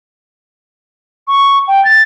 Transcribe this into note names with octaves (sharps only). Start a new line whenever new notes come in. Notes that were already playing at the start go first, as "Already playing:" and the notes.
C#6
G5
A6